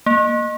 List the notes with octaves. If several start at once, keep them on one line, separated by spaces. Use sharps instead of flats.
A#3